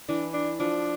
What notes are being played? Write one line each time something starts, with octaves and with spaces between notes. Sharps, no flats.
E3 D4
D4
F3 D4